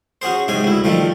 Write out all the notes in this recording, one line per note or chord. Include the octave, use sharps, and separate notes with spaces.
C#4 F#4 G#4 C5
G#2 C3 G#4 G#5
D2 E4
D#3 F3 G3 A3